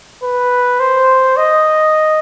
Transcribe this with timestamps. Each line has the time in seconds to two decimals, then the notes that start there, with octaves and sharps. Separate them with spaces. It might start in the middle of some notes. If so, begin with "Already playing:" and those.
0.23 B4
0.80 C5
1.37 D#5